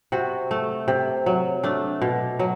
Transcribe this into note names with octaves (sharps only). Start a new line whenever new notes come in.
C3 F#4
A3
C3
F#3
A3 D4
B2
F#3